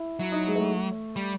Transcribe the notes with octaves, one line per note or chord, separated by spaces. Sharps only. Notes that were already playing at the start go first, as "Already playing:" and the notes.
Already playing: E4
F#3 E4
D#4
G#3
A3
G3